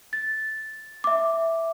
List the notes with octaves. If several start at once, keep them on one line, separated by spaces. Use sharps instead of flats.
A6
E5 D6